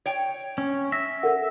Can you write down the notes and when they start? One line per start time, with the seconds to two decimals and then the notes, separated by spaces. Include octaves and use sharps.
0.06 C#5 G5
0.58 C#4
0.92 E5 A#6
1.23 A4 A#4 F#5